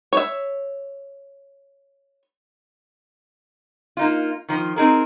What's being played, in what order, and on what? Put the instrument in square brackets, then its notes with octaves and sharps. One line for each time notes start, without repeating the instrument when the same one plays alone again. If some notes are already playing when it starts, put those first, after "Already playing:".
[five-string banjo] C#5 E5
[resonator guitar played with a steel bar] A#3 D#4 F4
D#3 F3
C4 D#4 G#4 A#4